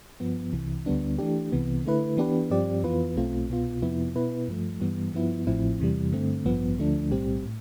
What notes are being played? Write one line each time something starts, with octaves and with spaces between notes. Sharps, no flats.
G2 F3 B3
C2 C3 E3
D2 D3 G3 B3 D4
E3 A3 D4 G4
C2 C3 E3 B3
D3 A3 E4 B4
E3 B3 D4 G4 B4
G2 F3 C4 G4 D5
F2 E3 B3 F4 B4
B1 B2 A3 C4 F4
C2 B2 B3 F4
F2 C3 F3 B3 E4
B2 B3 E4 B4
G2 F3 A3
G2 E3 G3 B3
G2 F3 B3 E4
A1 A2 F3 C4 E4
E2 C3 E3 G3
G2 D3 A3 C4
A1 G2 F3 B3
D2 D3 F3 A3 D4
B1 A2 G3 C4 G4
A2